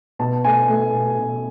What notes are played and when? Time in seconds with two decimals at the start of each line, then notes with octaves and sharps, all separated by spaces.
0.19 B2 A5
0.44 A3 G#5
0.68 A3
0.93 B2
1.18 B2